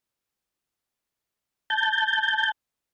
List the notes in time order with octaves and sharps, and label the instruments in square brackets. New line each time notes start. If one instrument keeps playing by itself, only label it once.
[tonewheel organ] A5 G6